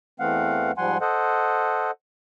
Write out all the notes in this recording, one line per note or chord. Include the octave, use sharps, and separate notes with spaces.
E2 E3 A3 C4 F5 F#5
G#2 F3 G3 F#5 G#5 C6
A4 C5 D#5 F#5